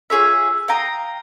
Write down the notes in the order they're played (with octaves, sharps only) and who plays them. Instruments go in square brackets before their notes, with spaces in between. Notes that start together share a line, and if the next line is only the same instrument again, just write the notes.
[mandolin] F4 G#4 C#5 E5
F5 G5 A#5 D#6